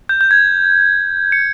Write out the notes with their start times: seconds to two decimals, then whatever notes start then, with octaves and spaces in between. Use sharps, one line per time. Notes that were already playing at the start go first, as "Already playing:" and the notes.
0.09 G6
0.21 G6
0.31 G#6
1.32 C#7